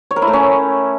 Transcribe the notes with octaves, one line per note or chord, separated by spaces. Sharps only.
C#5
A#4
E4
A3
C#4